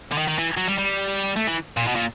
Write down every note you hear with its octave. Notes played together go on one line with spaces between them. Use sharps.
D3
D#3
D#3
E3
F#3
G3
G3
A3
E3
A#2
B2
A#2